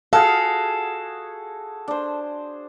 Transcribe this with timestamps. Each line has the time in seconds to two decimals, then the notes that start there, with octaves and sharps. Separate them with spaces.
0.13 F#4 G#4 A4 F5 F#5
1.88 D4 C5